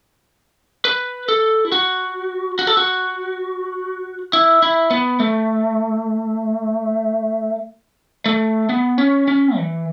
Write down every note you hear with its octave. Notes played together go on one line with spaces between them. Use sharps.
B4
A4
E4
F#4
F#4
A4
F#4
E4
E4
B3
A3
A3
B3
C#4
C#4
E3